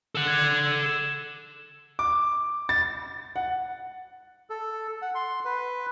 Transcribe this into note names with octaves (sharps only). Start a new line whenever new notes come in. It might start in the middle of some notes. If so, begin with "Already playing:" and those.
A4 F#5
G#6
E7
D6
A6
F#5
A4
F#5
C6
B4